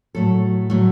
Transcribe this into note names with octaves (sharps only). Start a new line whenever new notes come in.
A2 F#3 A3 A4
A2 F#3 A3